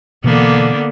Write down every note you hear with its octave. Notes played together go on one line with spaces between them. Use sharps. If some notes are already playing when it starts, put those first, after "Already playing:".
B2 D3 E3 A#3 B3